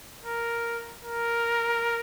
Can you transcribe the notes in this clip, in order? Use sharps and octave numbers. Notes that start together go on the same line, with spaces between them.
A#4
A#4